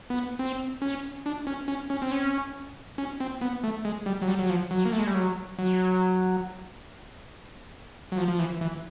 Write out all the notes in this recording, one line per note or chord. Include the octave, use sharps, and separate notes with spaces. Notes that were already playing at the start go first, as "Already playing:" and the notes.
B3
C4
C#4
D4
C#4
C#4
C#4
C4
C#4
C#4
C4
B3
A3
G#3
G3
F#3
G3
F#3
F3
F#3
A#3
A3
G#3
G3
F#3
F#3
F#3
F3
F3
E3
E3